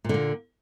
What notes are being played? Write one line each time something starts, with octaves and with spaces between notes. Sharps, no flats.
A#2 D3 A#3